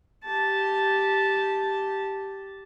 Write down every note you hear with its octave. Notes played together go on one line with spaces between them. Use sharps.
G4 A5